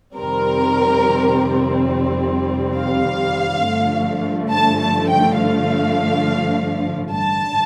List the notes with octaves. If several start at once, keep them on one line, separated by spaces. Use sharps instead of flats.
F2 C3 D#3 G3 C4 A#4
F5
G2 D3 F3 A3
A5
A5
G5
F5
A1 G2 D3 A5